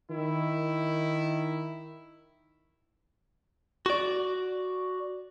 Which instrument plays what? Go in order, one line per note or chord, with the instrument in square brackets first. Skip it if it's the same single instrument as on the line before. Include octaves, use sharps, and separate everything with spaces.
[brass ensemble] D#3 E4
[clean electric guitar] F#4 D5